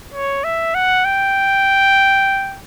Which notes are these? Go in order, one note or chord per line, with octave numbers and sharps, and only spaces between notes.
C#5
E5
F#5
G5